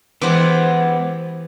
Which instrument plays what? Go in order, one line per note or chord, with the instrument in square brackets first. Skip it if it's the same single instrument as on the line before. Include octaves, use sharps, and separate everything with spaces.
[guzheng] E3 G4 C5 [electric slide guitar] G#3 B3 [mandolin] F#5 D6